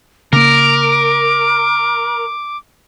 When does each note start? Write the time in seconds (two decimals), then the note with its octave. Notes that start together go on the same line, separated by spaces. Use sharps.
0.33 C#3 A#3 A#4 D6